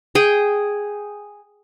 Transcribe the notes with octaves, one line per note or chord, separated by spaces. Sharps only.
G#4 G5